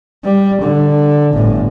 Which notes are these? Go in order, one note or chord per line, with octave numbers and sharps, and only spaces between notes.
G3
D3
G1 A2